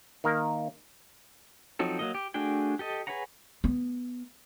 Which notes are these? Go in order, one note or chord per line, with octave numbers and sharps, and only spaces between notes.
D#3 A#3 A#4
F3 F#3 C4 D#4 A4
F#3 A#3 D#5
G4
A3 D4 F#4 G#4 G5
G4 A4 D#5
G#4 B4 C#5 F#5 A#5
B3